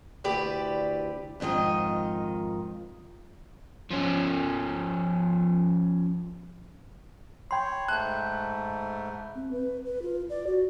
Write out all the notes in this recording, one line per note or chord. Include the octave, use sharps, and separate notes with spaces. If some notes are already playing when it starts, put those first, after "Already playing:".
D2 E4 G4 B4 D5
F2 G#2 D#3 F4 D#5
F3 C#4
C#5 G5 B5 C6
G#2 A3 A5 F#6 G6
C4
B4
B4
F4
D5
F#4